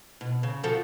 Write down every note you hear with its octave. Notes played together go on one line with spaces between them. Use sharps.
B2
C#3
F3 F#4 A4